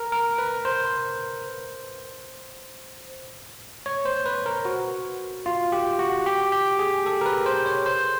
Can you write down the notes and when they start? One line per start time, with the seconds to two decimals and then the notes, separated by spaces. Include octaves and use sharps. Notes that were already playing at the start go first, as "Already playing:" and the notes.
Already playing: A#4
0.12 A#4
0.38 B4
0.65 C5
3.86 C#5
4.05 C5
4.26 B4
4.46 A#4
4.65 F#4
5.46 F4
5.72 G4
5.99 F#4
6.26 G4
6.52 G4
6.79 G#4
7.06 A4
7.21 A#4
7.26 B4
7.46 C5
7.66 C#5
7.86 C5